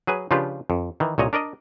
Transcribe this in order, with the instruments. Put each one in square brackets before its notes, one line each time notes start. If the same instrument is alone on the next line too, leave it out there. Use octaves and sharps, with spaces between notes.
[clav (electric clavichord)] F#3 G#4 B4 G#5
C#3 F3 D4 F4 G4 B4
F2
D#3 E3
C2 A#2 C#5 D#5 A#5
D4 A#4 D5 D#5